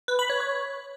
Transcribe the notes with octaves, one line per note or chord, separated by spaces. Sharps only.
B4
B5
C#5
C#5